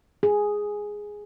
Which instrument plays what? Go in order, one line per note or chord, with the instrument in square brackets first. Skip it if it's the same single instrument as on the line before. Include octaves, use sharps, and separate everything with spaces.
[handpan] G#4